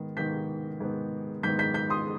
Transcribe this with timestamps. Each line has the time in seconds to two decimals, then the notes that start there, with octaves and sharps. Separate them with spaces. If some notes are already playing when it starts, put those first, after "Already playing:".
Already playing: G#2 D#3 B3
0.17 G#2 D#3 B3 G6 B6
0.80 G#2 D#3 B3
1.43 G#2 D#3 B3 G6 B6
1.59 G6 B6
1.74 G6 B6
1.90 C6 D#6